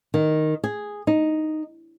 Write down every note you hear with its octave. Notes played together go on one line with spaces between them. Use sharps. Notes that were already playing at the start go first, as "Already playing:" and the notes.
D#3
G#4
D#4